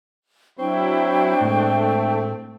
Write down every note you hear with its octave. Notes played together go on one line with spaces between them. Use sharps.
F#3 C4 D4 E4 G5 C#6
A2 G#3 A3